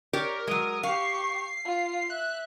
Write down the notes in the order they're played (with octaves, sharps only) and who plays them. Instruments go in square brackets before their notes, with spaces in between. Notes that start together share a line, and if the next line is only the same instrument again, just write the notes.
[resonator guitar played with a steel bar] G4 C#5 D5 [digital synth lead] A#4
[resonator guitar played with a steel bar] F#3 G#3 [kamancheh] D#6
[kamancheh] G4 C#6 [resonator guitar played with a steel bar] F5 [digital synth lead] C7
[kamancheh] F4
[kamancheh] E5 [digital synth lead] F#6